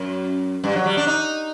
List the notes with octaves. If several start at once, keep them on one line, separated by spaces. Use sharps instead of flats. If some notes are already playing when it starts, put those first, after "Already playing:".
Already playing: F#2
G2
F#3
G3
D4
D#4